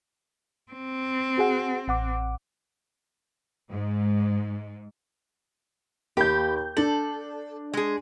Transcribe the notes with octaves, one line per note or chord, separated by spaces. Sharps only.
C4
F#4 G#4 F#5
A1 F#5 D6
G#2
D#2 G4 B5 G6
D4 A4 F#7
G#3 G#4